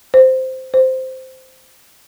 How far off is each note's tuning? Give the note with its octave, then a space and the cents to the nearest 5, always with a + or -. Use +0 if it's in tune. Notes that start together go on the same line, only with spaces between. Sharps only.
C5 -5
C5 -5